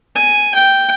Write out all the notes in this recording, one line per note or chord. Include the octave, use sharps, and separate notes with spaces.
G#5
G5